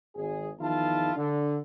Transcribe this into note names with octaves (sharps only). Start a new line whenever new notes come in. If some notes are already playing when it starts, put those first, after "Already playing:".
G#1 G#4
E2 D#3 F3 E4 F4 A5
D3